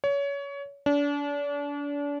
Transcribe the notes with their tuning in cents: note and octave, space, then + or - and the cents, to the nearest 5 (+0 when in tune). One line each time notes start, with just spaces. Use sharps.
C#5 +25
D4 -35